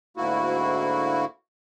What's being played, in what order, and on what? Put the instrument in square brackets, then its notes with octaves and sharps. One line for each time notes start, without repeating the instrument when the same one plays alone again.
[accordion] D2 G#2 A#3 E4 F#4